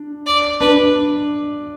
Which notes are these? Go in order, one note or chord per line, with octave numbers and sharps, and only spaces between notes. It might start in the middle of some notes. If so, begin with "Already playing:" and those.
Already playing: D4
D5
D4 B4